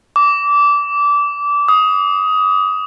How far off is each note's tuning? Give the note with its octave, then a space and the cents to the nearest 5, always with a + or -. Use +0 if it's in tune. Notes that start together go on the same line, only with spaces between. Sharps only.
D6 -20
D#6 +15